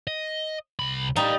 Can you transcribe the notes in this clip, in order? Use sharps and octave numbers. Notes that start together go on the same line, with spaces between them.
D#5
C2 B5
G3 D#4 D5 F5